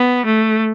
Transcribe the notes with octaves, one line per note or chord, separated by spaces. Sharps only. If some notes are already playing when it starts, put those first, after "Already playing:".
Already playing: B3
A3